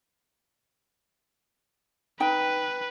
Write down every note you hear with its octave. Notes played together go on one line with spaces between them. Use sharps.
D#4 B4 G5